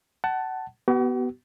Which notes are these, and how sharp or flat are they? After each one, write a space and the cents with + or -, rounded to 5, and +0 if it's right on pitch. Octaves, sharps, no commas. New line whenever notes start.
F#5 +25 A5 +0
B3 +0 F#4 +45